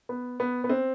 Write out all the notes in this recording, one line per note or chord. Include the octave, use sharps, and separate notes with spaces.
B3
B3
B3
C4